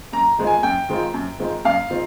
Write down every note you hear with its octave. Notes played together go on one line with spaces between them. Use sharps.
F#2 A#5
D#3 G#3 C4 F4
G#5
F#2 G5
D#3 G#3 C4 F4
F#2
D#3 G#3 C4 F4
F#2 F5
D#3 G#3 C4 F4